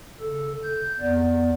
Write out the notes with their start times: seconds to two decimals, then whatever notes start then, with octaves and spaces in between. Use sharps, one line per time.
0.20 C#3 A4
0.63 G6
1.00 F2 B3 D5